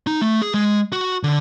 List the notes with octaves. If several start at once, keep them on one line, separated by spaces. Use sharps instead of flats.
D#4
A3
G#4
G#3
F#4
D3